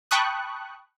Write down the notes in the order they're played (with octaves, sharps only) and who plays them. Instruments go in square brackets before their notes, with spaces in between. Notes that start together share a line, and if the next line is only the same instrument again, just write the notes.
[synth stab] G5 A5 B5 C#6 D#6 F#6